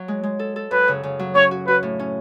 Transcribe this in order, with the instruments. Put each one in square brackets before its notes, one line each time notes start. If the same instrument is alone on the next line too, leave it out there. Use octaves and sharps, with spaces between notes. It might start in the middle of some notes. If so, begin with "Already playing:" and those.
Already playing: [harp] F#3
G#3
G#3
A4
A4
[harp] F#2 [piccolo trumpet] B4
[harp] C#3
C#3
F#3
[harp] C#4 [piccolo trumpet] C#5
[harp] F#4
[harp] F#4 [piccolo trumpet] B4
[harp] A2
C#4